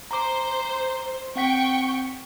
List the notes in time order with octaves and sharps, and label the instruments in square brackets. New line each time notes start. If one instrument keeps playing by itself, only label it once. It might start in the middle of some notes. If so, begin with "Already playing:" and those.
[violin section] C5 [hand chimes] A#5 D6
[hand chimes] C4 F#5 B6 [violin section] G5 C#6